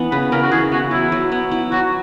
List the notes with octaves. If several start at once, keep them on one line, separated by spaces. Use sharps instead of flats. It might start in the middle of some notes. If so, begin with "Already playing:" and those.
Already playing: E3 B3
C#3 B4
C#3 A#4
F#4
E3 G#4
B3 F#4
F#3 E4
F#3
B3
E4
F#3 F#4